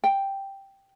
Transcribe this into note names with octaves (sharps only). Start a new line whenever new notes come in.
G5